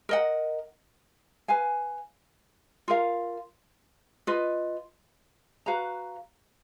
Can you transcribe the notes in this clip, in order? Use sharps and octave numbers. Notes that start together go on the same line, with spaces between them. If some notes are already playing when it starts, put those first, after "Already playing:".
A#4 D#5 F#5
B4 F5 G#5
F4 A#4 F5
F4 B4 D#5
F#4 B4 F5 A#5